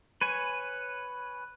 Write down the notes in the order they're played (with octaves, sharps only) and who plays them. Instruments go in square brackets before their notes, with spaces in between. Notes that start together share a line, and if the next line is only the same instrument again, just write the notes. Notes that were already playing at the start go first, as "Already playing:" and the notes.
[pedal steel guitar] B4 C#5 G#5